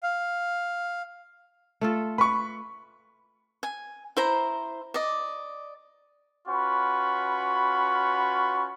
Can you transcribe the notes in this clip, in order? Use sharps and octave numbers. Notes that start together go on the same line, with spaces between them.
F5
A3 F4 A4
B4 B5 C#6
G#5
E4 C5 A#5
D5 D#5
C#4 F4 F#4 B4 B5 C#6